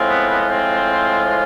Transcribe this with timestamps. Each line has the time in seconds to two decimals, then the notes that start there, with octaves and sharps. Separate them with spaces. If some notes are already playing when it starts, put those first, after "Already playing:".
Already playing: A2 F3 G#3 C4 F4
0.08 B3 B4
0.28 B3 B4
0.41 B4
0.49 C4 C5